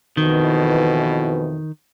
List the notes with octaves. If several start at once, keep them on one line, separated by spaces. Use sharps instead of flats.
F2 B2 D#3 E3